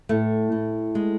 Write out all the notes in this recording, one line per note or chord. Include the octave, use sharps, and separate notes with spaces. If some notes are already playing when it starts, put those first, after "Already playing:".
A2 A3
A2
G#3